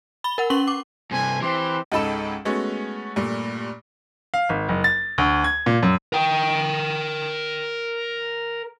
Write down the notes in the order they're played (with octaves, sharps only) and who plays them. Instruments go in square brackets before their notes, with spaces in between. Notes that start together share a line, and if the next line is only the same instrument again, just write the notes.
[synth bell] B5 G7
A#4 F#5
C#4 C#6 F#7 G7
D6
[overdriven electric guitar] G2 C3 [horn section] A4 C5 G#5
[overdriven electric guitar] E3 [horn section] C4 G4 C6
[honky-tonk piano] C#2 G#2 D#4 A4 B5 E7
G#3 A3 B3 C#4 F#4
G2 A#2 A3
[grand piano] F5
G#1
F#1
A6
D2
G#6
A#2
F#2
[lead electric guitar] A#4 G5